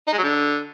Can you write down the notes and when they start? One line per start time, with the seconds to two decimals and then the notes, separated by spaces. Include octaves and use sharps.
0.07 D#4
0.13 G#3
0.18 F#3
0.23 D3